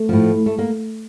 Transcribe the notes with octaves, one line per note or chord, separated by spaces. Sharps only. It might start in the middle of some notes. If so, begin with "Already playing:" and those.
Already playing: A3
A2 F3
A3
A#3